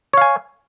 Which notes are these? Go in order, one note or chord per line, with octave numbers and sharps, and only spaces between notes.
C#5 F5 G#5